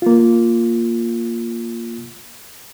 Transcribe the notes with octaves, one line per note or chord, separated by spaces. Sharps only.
A#3 F4